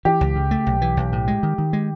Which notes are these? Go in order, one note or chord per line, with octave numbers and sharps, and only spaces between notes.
E3 G4
C#2
C#3
A3
B1
E3
B1
A2
G#3
D#3
D#3
G#3